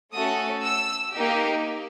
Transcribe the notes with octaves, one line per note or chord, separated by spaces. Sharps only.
A3 C#4 F#4 A4 D#6
E6
A#3 D#4 G4